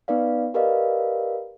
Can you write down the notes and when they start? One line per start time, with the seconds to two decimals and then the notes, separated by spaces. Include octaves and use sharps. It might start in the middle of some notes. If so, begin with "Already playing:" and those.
0.08 B3 D#4 B4 D5 F5
0.54 G4 A#4 B4 D5 D#5 F5